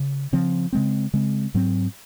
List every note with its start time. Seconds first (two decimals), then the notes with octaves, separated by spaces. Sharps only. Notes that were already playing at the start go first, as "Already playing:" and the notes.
Already playing: C#3
0.33 C#3 F3 C4
0.73 C#3 G#3 C4
1.13 C#3 G#3 C4
1.54 G#2 F#3 C4